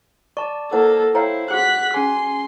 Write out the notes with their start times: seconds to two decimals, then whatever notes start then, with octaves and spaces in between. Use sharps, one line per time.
0.37 D5 A5 C#6
0.72 A#3 E4 A4 C5 F#5
1.15 E4 C5 C#5 F5 G5 A#5
1.51 F#4 G#4 F#5 F#6 B6
1.94 C#4 G#4 G#5 C6